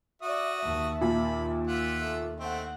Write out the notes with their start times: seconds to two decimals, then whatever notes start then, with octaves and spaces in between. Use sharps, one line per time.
0.22 F#4 D5 E5 D#6
0.63 D#2 E5 A5
1.01 A#2 B5
1.68 F4 E5 F#5
2.01 A3
2.40 A3 C4 D#5 F#5